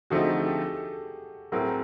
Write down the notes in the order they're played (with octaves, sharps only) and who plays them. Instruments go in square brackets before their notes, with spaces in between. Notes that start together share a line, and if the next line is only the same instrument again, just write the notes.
[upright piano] D3 F3 A3 C4 D#4 [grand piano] F#4 G#4
[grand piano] G4 A4
[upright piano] A2 F#3 A3 C4 [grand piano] G#4 A#4